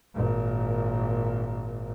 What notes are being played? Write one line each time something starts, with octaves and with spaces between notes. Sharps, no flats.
G#1 A#2